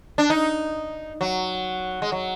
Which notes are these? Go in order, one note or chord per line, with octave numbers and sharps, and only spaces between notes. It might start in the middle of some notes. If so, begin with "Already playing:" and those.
D4
D#4
F#3
G#3
F#3